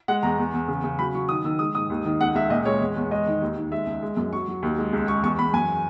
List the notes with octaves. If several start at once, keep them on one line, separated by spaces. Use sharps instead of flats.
G#3 F#5
E2 A#5
E2
E2
C#3
C#3
F#3 B5
F#3 C#6
D#3 D#6
D#3 E6
G#3 D#6
G#2 D#6
D#2
D#3
C#2 F#5
C#2 E5
A#2 D#5
G#3 C#5
E2
E2
G#3 D#5
D#3
D#2
D#3
G#3 E5
C#2
G#3
F#2
F#3 C#6
F#3
D#2
G#3
C#2
G#3 C#6
E2 C#6
E2 B5
F#2 G#5